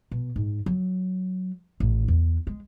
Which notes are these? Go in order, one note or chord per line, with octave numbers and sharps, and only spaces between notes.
B2
G#2
F#3
A1
E2
G#3